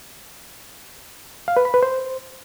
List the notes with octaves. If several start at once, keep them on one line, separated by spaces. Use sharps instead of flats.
F5
B4
B5
B4
C5